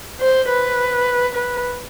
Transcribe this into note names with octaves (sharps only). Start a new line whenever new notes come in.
C5
B4
B4